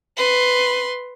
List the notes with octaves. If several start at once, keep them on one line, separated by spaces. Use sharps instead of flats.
B4 C6